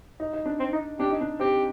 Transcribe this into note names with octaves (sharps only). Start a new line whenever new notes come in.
D#4
D#4
D4
C4
D#4
D4 G4
D#4
D4
C4 G4